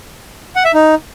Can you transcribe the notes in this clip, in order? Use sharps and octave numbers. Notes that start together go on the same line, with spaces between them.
F#5
E5
D#4